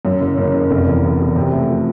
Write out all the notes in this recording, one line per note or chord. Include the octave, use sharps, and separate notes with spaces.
F#2
F#1
F#1
F#1
F1
E2
E2
B2
C3
A3
F3